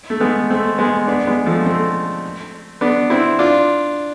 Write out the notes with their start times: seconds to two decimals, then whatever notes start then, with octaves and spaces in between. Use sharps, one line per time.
0.10 A3
0.20 G#3 B3
0.50 A3 C4
0.78 G#3 B3
1.07 B3 D4
1.27 G#3 B3
1.46 F3 A3
1.65 A3 C4
2.81 B3 D4
3.10 C4 E4
3.39 D4 F4